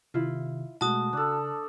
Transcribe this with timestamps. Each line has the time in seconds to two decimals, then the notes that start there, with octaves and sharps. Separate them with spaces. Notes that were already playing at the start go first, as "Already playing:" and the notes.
0.14 C3 D#3 E4 F4
0.81 B2 G#3 A3 F#4 A5 D#6
1.13 C#3 D4 A4